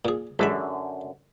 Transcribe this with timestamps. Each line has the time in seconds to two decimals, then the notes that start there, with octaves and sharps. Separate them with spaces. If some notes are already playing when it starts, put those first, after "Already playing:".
0.05 A#2 G#4
0.39 A1 F#2 D3 G#3 E5 B5